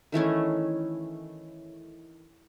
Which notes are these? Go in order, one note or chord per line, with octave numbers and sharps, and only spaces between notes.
D#3 E3 A3 C#4